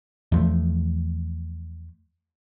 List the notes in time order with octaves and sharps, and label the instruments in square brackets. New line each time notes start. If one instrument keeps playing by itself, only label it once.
[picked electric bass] E2 F3 A3